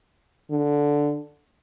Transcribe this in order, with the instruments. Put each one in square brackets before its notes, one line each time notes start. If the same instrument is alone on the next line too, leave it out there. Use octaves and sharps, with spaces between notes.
[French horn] D3